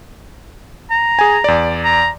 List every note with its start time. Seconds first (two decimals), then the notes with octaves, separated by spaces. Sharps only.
0.91 A#5
1.19 G#4 G#5
1.44 E2 D5
1.84 A#5